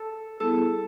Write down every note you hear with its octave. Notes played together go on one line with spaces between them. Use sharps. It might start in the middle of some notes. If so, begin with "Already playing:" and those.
Already playing: A4
G3 B3 E4 G#4 A4